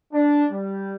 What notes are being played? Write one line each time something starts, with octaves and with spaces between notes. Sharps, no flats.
D4
G3